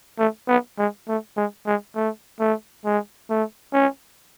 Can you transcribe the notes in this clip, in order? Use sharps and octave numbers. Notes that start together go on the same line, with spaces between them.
A3
B3
G#3
A3
G#3
G#3
A3
A3
G#3
A3
C#4